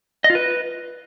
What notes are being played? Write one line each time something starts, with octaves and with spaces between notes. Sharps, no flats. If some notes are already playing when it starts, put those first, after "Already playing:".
D#5
F4
B4